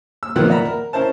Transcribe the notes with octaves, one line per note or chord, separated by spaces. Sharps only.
E6
B1 A#2 D#3 F3 B3 F#6
A#4 D5 E5 F#5 A#5 B5
A#4
C#4 E4 A#4 C5 A5